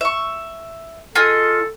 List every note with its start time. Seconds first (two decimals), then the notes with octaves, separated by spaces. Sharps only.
0.01 E5 C#6
1.15 F4 G#4 A4 D#5